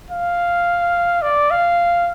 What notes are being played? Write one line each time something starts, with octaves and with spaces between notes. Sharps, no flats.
F5
D5
F5